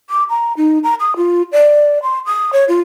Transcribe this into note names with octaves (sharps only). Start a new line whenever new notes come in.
D6
A#5
D#4
A#5
D#6
F4
D5
C6
D#6
C#5
F4